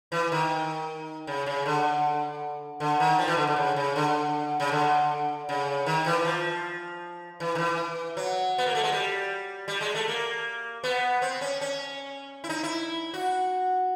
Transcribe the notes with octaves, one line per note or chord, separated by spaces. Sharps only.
E3
D#3
C#3
C#3
D3
D3
D#3
F3
E3
D3
D3
C#3
C#3
D3
C#3
D3
C#3
D#3
E3
F3
E3
D#3
E3
F#3
B3
A#3
A3
G#3
G3
G3
G#3
A3
A#3
B3
C4
C#4
C#4
E4
D#4
E4
F#4